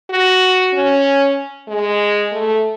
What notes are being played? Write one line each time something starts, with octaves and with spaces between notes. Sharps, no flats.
F#4
C#4
G#3
A3